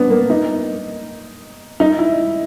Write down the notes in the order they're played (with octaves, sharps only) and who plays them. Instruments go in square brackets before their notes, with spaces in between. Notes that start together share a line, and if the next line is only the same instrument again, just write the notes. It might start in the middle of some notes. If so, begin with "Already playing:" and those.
Already playing: [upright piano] B3 C4 D4
A#3
D#4
D#4
E4